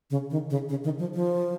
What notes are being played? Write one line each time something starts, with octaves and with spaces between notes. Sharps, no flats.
C#3
D#3
C#3
C#3
D#3
F3
F3